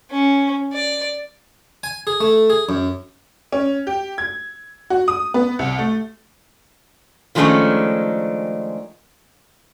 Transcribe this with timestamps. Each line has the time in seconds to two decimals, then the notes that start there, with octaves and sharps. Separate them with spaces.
0.11 C#4
0.73 D5
1.83 G#5
2.07 G#4
2.20 A3
2.50 G#4
2.69 F#2
3.52 C#4
3.87 G4
4.18 G#6
4.90 F#4
5.08 D#6
5.34 B3
5.59 C2
5.79 A3
7.35 D#3 F3 G#3 A3 C#4 D4